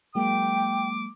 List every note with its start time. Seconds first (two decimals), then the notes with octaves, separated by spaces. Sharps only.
0.15 F#3 G#3 A#3 G5 D6